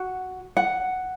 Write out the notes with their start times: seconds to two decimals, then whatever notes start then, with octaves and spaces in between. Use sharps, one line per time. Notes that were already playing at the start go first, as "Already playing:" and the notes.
Already playing: F#4 F#5
0.57 F#5